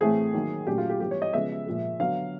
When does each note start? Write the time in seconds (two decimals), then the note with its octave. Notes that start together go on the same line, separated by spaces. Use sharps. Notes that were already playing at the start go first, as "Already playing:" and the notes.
0.01 A2 E3 A3 C4 G#4
0.33 D#3 F#3 A#3
0.67 A#2 F#3 A3 C#4 G4
0.78 F4
0.89 G4
1.00 E3 G3 B3 G4
1.11 C#5
1.22 D#5
1.33 C#3 F3 G#3 B3 E5
1.66 A#2 F3 G#3
2.00 D3 F#3 B3 F5